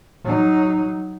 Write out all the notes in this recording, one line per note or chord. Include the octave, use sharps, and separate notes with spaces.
F#3 D#4